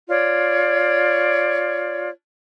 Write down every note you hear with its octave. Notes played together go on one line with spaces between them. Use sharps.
F4 C#5 D5